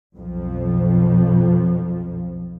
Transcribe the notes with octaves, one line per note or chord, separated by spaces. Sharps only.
B1 F2 F3